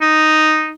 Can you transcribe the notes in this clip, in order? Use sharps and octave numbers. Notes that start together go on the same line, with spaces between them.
D#4